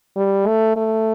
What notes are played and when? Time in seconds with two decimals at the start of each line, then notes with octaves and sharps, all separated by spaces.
0.17 G3
0.47 A3
0.76 A3